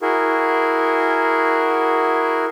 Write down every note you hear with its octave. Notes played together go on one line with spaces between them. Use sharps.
E4 F#4 G#4 A#4